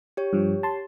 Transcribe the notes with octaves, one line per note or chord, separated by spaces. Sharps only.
G4 C#5
G2 F3
A5 C6